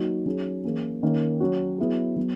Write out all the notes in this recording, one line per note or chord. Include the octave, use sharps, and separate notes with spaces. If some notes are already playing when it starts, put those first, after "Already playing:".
Already playing: F#3 A#3 D#4 F#4
F#3 C#4 G#4
E3 A#3 C#4 G#4
D#3 A#3 C#4
F#3 C#4 F#4
F#3 B3 E4 G#4
F#3 B3